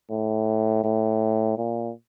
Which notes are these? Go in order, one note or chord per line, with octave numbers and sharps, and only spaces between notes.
A2
A2
A#2